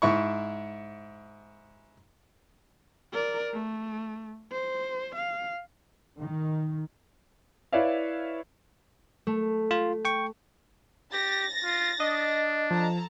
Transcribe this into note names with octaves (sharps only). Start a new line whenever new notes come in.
G#2 E4 C#6
A#4 D5
A3
C5
F5
D#3
E4 B4 C#5 D5 E5 F5
A3
F4
G5 C#6
G4 A6 A#6
F4
D4 D#5
F3 A4 A5 A#5